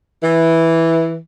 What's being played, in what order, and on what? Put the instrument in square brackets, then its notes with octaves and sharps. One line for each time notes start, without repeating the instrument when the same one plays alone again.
[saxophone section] E3